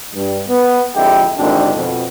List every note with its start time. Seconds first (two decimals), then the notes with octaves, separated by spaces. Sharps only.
0.15 G2
0.48 B3
0.95 F2 D3 G#3 E4 G4
1.38 G#1 A#2 D3 D#3 D4 G4
1.75 F2 B2